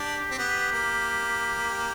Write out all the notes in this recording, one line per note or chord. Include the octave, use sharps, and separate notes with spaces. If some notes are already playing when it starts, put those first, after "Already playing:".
Already playing: D4 G4
C4
B3 G4
A#3
G4